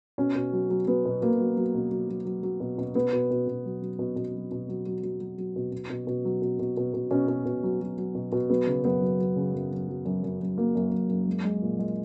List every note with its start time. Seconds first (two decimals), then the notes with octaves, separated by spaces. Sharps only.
0.18 B2 C#4
0.35 B2
0.53 F#3
0.70 F#3
0.87 F#3 B3
1.05 B2
1.22 B2 A#3
1.39 F#3
1.57 F#3
1.75 B2
1.91 F#3
2.09 F#3
2.25 F#3
2.43 F#3
2.60 B2
2.78 B2
2.95 B2 B3
3.13 B2
3.31 B2
3.47 B2
3.65 F#3
3.82 F#3
3.99 B2
4.16 B2
4.34 F#3
4.52 B2
4.69 F#3
4.86 F#3
5.03 F#3
5.20 F#3
5.38 F#3
5.56 B2
5.72 B2
5.90 B2
6.07 B2
6.25 F#3
6.42 B2
6.59 B2
6.77 B2
6.94 B2
7.11 B2 C#4
7.28 B2
7.45 B2
7.63 F#3
7.81 F#3
7.98 F#3
8.15 B2
8.32 B2
8.49 F#3 B3
8.67 C#3
8.84 F#2 B3
9.01 F#3
9.19 F#3
9.36 C#3
9.54 F#2
9.71 F#2
9.88 F#3
10.05 F#2
10.24 F#2
10.40 F#2
10.57 F#3 A#3
10.75 F#2
10.92 F#2
11.09 F#2
11.28 G#3
11.44 G#3
11.62 A#2
11.79 G#3